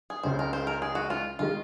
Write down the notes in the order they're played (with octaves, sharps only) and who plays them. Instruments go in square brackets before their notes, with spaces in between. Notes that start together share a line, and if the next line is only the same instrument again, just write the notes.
[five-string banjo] G#4
[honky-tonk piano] C#2 C#3 G#3 [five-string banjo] C5
[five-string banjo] A#4
C5
A#4
G#4
F#4
F4
[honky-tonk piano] D#3 G#3 [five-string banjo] F4